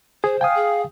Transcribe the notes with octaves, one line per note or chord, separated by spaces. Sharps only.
G#4 C5
F5 G5 G#5 D#6
G#4